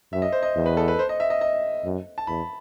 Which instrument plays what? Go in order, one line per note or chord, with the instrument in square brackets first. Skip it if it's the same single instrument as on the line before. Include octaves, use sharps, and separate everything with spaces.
[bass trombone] F#2 [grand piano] E5
[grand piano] D#5
C5
D#5
[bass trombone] E2
[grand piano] B4
A4
B4
C5
D#5
E5
D#5
D#5
[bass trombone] F#2
[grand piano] A5
[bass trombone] E2 [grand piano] B5